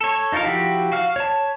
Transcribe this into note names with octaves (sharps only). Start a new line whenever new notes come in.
A4 C#5
D#4 F4 A4 A#4 F5
F3 E4 F#4 G4
F#4 F5 F6
C#5 A5